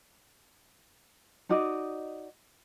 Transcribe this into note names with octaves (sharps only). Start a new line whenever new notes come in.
D#4 F#4 D5 D#5